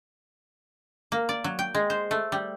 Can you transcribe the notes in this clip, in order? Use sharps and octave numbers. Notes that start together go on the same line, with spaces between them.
A#3
D5
F#3
G5
G#3
C5
A3
G3